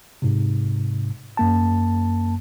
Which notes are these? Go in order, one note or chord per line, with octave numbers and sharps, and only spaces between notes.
G#2 C3
F#2 A#3 A5